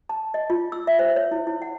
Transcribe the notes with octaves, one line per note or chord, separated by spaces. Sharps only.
A5
D#5
F4
E6
E5
C5
C#5
E4
E4
F#5